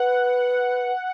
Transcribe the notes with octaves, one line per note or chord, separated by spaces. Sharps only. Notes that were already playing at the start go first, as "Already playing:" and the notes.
Already playing: B4 F#5